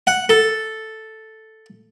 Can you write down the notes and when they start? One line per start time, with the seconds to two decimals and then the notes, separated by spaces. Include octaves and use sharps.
0.07 F#5
0.29 A4